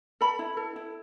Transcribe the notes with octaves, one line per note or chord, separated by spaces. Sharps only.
A4 B5
E4
A4
E4